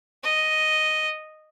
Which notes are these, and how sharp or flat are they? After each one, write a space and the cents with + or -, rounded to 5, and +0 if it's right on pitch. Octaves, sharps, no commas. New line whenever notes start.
D#5 +0